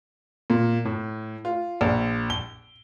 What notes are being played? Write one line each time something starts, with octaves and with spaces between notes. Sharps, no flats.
A#2
A2
F4
A#1
G7